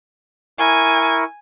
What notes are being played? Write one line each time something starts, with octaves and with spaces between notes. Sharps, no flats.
E4 A#4 G#5 C#6